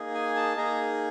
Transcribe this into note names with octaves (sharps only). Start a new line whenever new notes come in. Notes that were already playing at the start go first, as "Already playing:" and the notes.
Already playing: A#3 D#4 G#4
G#5
A5
A#3 D#4 G#4 A#5